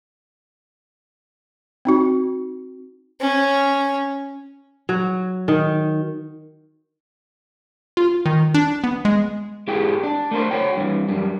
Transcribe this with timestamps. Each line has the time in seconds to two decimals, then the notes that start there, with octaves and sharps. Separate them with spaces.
1.85 C4 D#4 F#4
3.20 C#4
4.89 F#3
5.48 D#3
7.97 F4
8.26 D#3
8.54 D4
8.84 B3
9.05 G#3
9.68 G#2 E4 G4 G#4 G5
10.03 D4
10.31 A3 A#4 C5
10.51 F#4 C#5 G5
10.77 G2 E3
11.08 F#2 G3